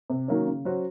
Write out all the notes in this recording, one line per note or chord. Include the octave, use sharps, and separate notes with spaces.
C3
D#3 F#3 A#3 C#4
C#3
F#3 C#4 F#4 C5